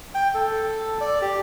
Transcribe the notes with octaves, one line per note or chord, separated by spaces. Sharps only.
G5
A4
D5
G4